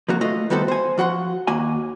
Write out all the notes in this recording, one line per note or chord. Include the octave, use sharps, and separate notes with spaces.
F3 A#3 F#4
A3 F4 D#5
D#3 G3 B3 F#4 A4 C5
C5 G#5
F3 F#4 F#5 C6
D#2 A#3 F#4 G#5